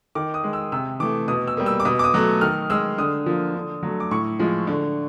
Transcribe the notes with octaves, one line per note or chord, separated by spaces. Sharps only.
D#3 D6
D#6
G#3
E6
C3 E6
E3 A3 D6
B2 D#6
E6
G3 A#3
E6
D6
B2 D#6
D6
D#6
F#3 A3
D#3 F6
G#3 E6
D3 D#6
F3 A#3
D3
F#3 A3
D6
A2 C#6
F3 G#3
D3